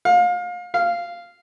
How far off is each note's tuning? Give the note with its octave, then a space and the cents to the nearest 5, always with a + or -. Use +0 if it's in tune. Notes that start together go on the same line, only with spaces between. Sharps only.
F5 +30
F5 -10